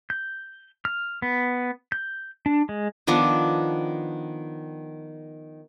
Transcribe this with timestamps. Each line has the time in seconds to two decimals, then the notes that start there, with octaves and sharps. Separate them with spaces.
0.10 G6
0.85 F6
1.22 B3
1.92 G6
2.46 D4
2.69 G#3
3.07 D#3 F3 B3 D4